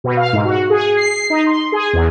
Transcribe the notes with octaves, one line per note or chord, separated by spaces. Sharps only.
B2
F5
G#2
F#4
G#4
C7
D#4
C6
G#4
E2